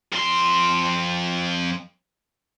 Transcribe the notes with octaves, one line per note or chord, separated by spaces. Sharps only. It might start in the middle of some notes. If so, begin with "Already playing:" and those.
F2 C6